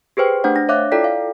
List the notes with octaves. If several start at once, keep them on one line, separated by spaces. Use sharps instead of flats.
G4 G#4 B4 C5 G5
A3 D4 C5 F#5
D4 A#6
C#5 E5 F5 D6 F#6
E4 F4 A4 D5 G5 B6
F5